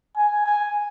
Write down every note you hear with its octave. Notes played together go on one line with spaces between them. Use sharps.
G#5
G#5